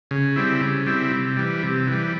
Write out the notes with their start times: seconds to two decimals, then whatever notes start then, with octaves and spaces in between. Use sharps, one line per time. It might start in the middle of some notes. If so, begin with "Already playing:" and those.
0.11 C#3
0.36 G3 C4 E4
0.61 C#3
0.86 G3 C4 E4
1.11 C3
1.37 E3 G3
1.63 C3
1.87 E3 G3